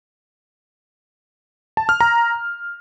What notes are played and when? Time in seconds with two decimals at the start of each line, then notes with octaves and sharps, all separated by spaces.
1.77 A5
1.89 F6
2.01 A#5